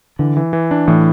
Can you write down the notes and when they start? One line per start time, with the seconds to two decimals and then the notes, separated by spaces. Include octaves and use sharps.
0.19 D3 E3
0.37 E3
0.53 E3
0.71 D4
0.88 A2 E3